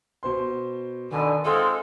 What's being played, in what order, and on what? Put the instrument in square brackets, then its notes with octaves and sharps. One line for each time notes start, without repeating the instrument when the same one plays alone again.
[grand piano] B2 C5 C6
[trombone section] B2 D3 [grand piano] D#3 [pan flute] G#5
[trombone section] G#3 C4 F4 [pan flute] A4 [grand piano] E6